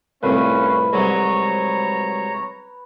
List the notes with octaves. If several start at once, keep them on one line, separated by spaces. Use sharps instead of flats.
C2 F2 A2 C#4 B4 F5
C2 G#2 F#3 C#5 A#5